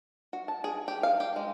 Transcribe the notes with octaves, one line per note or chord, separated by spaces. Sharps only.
F#4
A5
G#4
G4
F5
G4
G#3